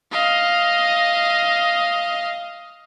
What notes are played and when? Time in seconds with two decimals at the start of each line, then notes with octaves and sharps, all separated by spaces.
0.12 D#5 F5